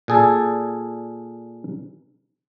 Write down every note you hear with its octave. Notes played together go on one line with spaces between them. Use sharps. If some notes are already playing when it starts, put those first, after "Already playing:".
A#2 G#4 A4